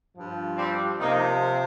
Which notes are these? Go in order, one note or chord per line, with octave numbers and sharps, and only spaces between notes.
G2 F3
G3 C4
C3 F3 A#3 D#4